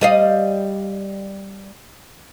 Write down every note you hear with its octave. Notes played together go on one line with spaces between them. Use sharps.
G3 D#5 F5